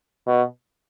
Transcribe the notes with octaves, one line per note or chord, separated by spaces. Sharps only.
B2